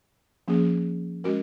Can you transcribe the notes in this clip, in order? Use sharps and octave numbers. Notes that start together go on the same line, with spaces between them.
F3 A#3 C#4 G#4
G#3 C#4 F#4 A#4